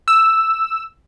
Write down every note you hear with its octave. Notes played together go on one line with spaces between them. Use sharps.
E6